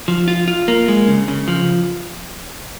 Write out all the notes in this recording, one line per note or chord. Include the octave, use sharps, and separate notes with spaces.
F3
F4
F4
A#3
G#3
C#3
C#3
F3